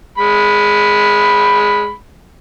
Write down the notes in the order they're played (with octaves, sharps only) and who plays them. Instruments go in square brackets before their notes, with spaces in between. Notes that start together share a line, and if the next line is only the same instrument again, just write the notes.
[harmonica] G#3 B5